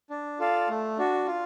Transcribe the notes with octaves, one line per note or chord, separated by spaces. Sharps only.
D4
F4 A4 D5 F5
A3
D4 F#4
F4